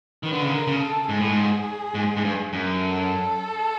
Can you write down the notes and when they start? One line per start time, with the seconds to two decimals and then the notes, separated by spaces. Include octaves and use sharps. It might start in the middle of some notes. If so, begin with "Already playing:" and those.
0.23 D#3 B4
0.33 D3
0.42 C#3
0.52 D3 A#4
0.67 C#3
0.81 A4
1.09 G#2 G#4
1.19 A2
1.28 G#2
1.94 G#2
2.17 G#2
2.24 G2
2.53 F#2
2.80 A4